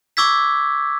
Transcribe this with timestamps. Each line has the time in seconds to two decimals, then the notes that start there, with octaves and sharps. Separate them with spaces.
0.17 C#6 D6 E6 G#6 B6